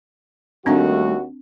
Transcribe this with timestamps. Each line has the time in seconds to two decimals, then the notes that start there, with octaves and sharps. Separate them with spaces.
0.66 D#2 D#3 G3 A3 C4 D4 F#4